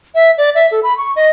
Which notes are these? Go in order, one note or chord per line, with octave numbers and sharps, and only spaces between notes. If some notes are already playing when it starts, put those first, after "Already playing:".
E5
D5
E5
A4
B5
C#6
D#5